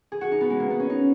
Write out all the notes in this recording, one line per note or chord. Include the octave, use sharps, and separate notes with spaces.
G#4
F#4
D#4
B3
G#3
A#3
B3
C#4
D#4